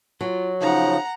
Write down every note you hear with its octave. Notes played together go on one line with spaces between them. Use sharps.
F#3 F4
C#3 F3 D#4 F#5 A#5